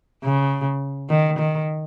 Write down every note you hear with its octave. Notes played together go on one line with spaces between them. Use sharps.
C#3
D#3
D#3